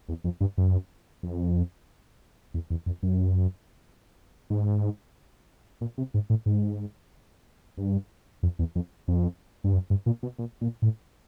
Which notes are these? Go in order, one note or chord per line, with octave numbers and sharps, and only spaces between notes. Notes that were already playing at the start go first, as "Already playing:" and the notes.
E2
F2
G2
F#2
F2
E2
E2
F2
F#2
G#2
A#2
C3
G#2
A2
G#2
G2
F2
E2
F2
F2
G2
F#2
G2
A#2
B2
A#2
A#2
A2